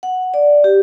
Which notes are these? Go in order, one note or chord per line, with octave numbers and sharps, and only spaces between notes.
F#5
D5
G4